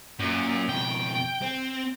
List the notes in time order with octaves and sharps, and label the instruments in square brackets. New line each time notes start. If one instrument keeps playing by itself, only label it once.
[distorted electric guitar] F#2 [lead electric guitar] A#2
[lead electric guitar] F2 B2 [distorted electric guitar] G5
[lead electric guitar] C4